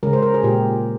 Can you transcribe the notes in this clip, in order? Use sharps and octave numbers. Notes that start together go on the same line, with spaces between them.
C#3 G#3 A#4
C5
A#4
G#4
A#2 G#3 G4